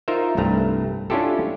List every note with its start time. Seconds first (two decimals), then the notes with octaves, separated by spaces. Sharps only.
0.08 D#4 F4 A#4 C5 E5
0.37 C2 G2 A3 A#5
1.10 C#4 D4 E4 F4 G4 A4